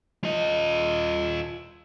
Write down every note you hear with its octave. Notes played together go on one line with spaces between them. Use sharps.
F4 D#5